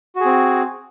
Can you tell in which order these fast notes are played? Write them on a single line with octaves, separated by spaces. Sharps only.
F#4 G#4 C4